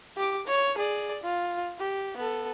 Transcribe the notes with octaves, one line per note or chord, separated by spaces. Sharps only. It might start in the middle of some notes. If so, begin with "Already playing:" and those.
G4 D6
C#5
G#4 D5
F4
G4
B3 A4